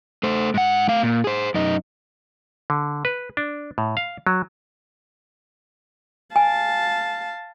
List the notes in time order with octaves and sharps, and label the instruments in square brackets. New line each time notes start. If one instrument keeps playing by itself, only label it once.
[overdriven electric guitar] A3 C5
G#2 F#5
A3 F5
A#2
G#4 C5
F#2 D#4
[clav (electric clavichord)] D3
B4
D4
A2
F5
F#3
[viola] F5 A5 [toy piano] G#5